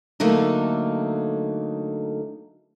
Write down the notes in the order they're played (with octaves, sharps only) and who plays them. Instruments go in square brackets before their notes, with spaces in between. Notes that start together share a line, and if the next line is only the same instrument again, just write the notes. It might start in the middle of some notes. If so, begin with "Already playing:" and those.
[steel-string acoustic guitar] D3 F#3 A3 A#3 D#4